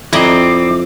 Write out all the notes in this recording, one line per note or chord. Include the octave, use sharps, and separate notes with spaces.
F2 C4 E4 D5 D#5 A#5 D6